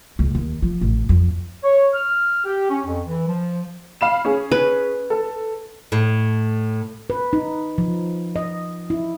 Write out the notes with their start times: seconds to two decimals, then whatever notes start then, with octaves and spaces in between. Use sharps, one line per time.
0.19 C#2
0.35 D#2
0.62 F3
0.81 A1
1.09 F2
1.63 C#5
1.94 F6
2.45 G4
2.69 C#4
2.85 F2
3.05 E3
3.27 F3
4.01 F5 B5 E7
4.25 C#4 G#4
4.52 B4
5.10 A4
5.92 A2
7.10 B4
7.33 D#4
7.78 F3
8.36 D#5
8.90 E4